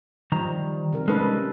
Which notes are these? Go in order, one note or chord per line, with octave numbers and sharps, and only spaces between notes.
D#3 F3 G3 A#5
C3 D#3 A#4
G#3 C#4 D#4 A4 B4